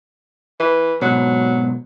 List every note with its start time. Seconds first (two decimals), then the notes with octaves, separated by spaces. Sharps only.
0.60 E3
1.02 G#2 B2 F#3